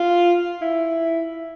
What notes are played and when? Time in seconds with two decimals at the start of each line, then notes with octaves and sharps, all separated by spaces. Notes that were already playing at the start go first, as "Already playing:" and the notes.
Already playing: F4
0.62 E4